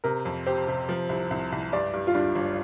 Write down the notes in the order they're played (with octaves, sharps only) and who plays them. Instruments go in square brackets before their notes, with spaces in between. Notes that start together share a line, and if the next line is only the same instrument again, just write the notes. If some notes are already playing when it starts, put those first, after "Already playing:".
[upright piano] C3 [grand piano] A#4
[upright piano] F2
[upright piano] G4 [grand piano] C5
[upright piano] C3
F3
C2
C2
C2
[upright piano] G2 [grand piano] D5
[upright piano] G2
[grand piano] F4
[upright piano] G3 [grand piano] D4
[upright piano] G1